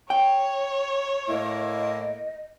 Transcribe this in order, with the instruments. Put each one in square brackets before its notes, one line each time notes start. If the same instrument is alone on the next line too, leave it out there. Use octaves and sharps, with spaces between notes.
[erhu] C#5 [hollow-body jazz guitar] G5
[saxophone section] A2 A#3 E4 [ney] D#5